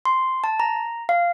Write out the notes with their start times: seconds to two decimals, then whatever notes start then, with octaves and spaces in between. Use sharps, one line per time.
0.05 C6
0.44 A5
0.60 A#5
1.09 F5